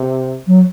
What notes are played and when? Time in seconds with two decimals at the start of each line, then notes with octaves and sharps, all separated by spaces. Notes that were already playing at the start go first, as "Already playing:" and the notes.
Already playing: C3
0.48 F#3